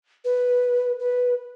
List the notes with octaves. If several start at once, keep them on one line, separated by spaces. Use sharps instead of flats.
B4
B4